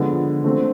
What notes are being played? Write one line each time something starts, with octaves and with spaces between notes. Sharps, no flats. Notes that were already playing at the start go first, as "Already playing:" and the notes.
Already playing: D3 F3 G#3 B3
D3 A3 C4